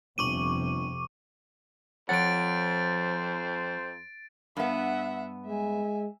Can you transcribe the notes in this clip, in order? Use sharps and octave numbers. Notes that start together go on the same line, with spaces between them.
G1 F2 C3 C#6 D6 D#7
F2 F3 C5 C#5 F#5 A6 D7
G2 B3 E5 F#5
G#3 E5 G#5